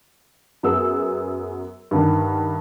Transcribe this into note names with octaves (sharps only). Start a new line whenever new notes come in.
F#2 B3 G#4 E6
G2 D3 D#3